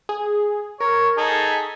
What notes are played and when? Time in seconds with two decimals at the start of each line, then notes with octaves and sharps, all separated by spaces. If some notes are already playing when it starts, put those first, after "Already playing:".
0.09 G#4
0.80 A#4 C#5
1.18 D#4 G#4 A4
1.47 B6